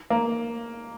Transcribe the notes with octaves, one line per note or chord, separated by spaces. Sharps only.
A#3